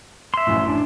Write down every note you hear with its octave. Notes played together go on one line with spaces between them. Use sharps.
E5 C6
A1 F#2 A2
D4